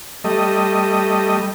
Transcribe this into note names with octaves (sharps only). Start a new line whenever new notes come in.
G3 A3 D#5